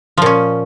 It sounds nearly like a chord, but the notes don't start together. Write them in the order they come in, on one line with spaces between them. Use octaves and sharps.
F3 A#2 C#4